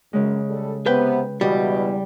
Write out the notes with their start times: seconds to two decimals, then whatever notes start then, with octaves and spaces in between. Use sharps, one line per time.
0.13 F#2 C#3 G#3
0.50 G3 A4
0.86 C3 B3 B4 G5
1.41 E2 B2 G3